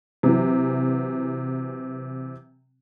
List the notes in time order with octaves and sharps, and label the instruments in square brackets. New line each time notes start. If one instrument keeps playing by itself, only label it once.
[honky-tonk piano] C3 E3 F#3